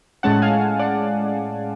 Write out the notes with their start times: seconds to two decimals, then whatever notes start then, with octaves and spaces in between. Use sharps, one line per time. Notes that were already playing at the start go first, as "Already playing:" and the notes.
0.23 A2 G#3 C#4 F#5 A5
0.42 F5 G#5
0.79 D5 F#5